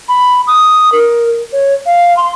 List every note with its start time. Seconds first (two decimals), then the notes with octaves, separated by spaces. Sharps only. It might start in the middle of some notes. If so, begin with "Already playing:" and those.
0.09 B5
0.47 D#6
0.92 A#4
1.53 C#5
1.86 F5
2.17 C6